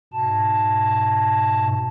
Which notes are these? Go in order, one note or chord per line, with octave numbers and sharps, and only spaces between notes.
G#2 B2 A5